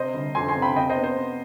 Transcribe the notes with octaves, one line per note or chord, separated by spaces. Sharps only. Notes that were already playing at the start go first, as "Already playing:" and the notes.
Already playing: C3 C5 D#5
G1
F2 G#5 C6
G#5 C6
C3
G5 B5
C3 D#5 G5
C5 D#5
B3
C5
B3